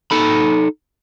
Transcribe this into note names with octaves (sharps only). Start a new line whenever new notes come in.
D#4 A4 B5